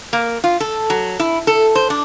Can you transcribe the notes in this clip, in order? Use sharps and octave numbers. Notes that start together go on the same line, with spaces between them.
A#3
F4
A4
F#3
E4
A4
C5
D4